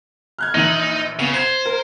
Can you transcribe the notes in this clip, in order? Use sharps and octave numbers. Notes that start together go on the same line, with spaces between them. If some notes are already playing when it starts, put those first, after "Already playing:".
F6 F#6 G#6
A#1 E3 D#4 F#7
C#3 B3 F7
C5 G#6 C7 F7
A#4